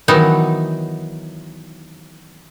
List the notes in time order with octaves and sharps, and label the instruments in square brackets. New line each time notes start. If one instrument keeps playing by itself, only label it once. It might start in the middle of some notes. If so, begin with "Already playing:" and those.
[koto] D#3 E3 F#3 B3 D#4